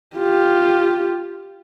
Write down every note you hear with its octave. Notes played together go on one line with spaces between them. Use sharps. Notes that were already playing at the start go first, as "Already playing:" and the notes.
F4 G4